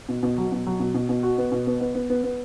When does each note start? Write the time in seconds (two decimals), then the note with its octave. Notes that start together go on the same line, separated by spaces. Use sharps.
0.09 B2
0.23 B2
0.38 F#3
0.52 B2
0.66 F#3
0.80 B2
0.94 B2
1.09 B2
1.23 F#4
1.38 B3
1.52 B2
1.67 B3
1.81 B3
1.95 B3
2.10 B3
2.24 B3